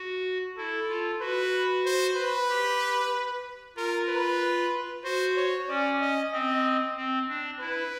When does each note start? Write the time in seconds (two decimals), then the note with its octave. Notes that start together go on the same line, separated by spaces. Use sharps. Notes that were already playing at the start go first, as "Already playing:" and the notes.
Already playing: F#4
0.57 E4 A4
0.89 F4
1.21 F#4 B4
1.85 C5
2.17 B4
2.49 G4
3.76 F4 A#4
4.08 B4
5.04 F#4 C5
5.36 C#5
5.69 C#4 D5
6.01 D#5
6.32 C4 D#5
6.97 C4
7.28 D4
7.60 E4 B4